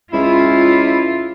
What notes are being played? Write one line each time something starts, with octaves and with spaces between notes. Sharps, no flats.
C#2 E4 F4